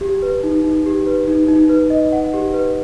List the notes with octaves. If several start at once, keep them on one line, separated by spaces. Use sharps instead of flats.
G4
B4
D#4
D#4
G4
B4
D#4
D#4
B4
D#5
F#5
G4
B4